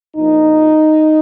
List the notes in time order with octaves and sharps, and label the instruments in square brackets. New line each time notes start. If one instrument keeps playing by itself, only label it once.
[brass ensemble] A#1 A#2 F3 D#4